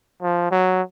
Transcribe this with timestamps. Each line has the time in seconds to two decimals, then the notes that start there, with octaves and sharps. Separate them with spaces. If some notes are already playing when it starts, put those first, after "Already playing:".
0.22 F3
0.51 F#3